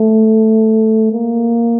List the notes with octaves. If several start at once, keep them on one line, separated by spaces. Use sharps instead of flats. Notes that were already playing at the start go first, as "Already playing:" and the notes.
Already playing: A3
A#3